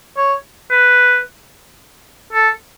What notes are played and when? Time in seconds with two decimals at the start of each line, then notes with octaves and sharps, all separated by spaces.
0.17 C#5
0.71 B4
2.33 A4